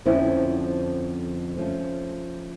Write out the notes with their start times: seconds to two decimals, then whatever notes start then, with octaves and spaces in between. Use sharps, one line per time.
0.06 F2 D3 F3 C#4 E4
1.57 F3 A3 C#4